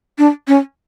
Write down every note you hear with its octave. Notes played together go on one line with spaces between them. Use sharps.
D4
C#4